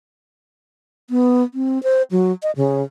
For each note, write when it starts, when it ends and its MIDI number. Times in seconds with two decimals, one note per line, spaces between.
1.10 1.43 59
1.54 1.81 60
1.83 2.02 72
2.11 2.32 54
2.43 2.51 75
2.56 2.83 49